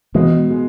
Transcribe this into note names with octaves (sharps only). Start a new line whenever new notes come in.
B2 E3 G#3
G#3